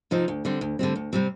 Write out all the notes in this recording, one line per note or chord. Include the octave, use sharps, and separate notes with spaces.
C3 F3 C4 D#4
D2
D3 G3 C4
D2
D3 G3 C4
D2
C3 G3 C4